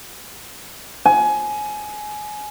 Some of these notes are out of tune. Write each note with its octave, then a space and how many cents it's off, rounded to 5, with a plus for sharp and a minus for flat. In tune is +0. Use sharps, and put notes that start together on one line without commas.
G#5 +20